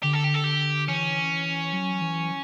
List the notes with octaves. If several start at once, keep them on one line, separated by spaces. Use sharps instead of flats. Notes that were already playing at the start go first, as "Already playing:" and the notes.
D3 G4
A4
G4
A4
G4
E3 C#4
F#3
E3